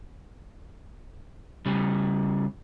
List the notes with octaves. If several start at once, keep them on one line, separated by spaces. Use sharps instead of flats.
C#3 G3